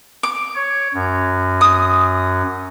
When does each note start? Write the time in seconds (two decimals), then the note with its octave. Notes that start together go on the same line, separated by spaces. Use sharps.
0.23 D6
0.55 C#5
0.94 F#2
1.61 D#6